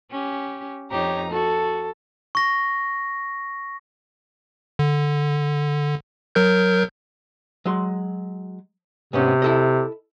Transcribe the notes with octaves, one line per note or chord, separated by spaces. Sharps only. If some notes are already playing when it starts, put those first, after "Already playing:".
C#4 G4
F2 D#4 G4 C#5 A#5
F#4 A4
C#6 A#6
D3
F#3 A#4 G6
F#3 G#3 C6
G#2 C3 B3 C#4
E4 A4 D#5